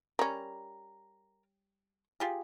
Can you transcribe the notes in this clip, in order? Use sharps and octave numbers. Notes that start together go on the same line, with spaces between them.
G3 C#4 A#4 A#5
F4 G4 G#4